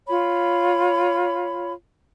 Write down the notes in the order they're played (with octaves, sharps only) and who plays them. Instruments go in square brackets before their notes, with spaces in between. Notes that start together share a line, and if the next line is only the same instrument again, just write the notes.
[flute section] F4 C#5 B5